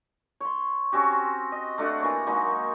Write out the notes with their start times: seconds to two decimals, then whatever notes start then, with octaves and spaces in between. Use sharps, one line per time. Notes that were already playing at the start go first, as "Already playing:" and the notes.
0.40 C#5 C6
0.93 C4 C#4 F#4 G4
1.52 D#5
1.78 A3 D4 F#4 F#5
2.00 E3 A#3 C#5
2.26 F#3 G#3 A#3 D#4